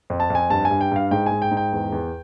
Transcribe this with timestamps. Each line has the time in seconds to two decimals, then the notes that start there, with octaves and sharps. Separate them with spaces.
0.10 F2
0.20 A5
0.30 F2 G#5
0.50 G2 A5
0.65 G#5
0.71 G2
0.81 G5
0.92 G2 F5
1.11 G#2 G5
1.26 G#2 G#5
1.42 G5
1.51 G#2
1.57 G5
1.73 E2
1.92 E2